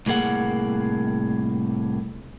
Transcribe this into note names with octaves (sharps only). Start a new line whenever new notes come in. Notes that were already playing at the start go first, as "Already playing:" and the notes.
C2 A2 A#3 G#4 F#5